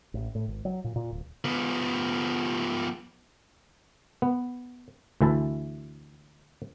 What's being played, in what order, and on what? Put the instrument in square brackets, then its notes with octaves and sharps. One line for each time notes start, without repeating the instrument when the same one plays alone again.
[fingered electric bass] A1
A2
G#1
F#3
A#2
A#2
D1
[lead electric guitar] F3 B3
[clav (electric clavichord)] B3
D2 E3 E4 A5